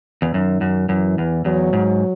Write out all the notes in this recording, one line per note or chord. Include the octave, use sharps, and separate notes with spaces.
E2
F#2 D#3
F#2
F#2 E3
E2
E2 F#3
G#2